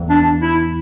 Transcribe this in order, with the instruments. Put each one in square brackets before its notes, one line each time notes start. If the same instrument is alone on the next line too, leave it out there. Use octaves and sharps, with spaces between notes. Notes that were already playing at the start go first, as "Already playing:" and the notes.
Already playing: [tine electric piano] E2 E3
[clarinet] D4
E4